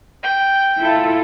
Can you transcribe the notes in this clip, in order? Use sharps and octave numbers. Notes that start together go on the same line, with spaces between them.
G5
E4 F4 A4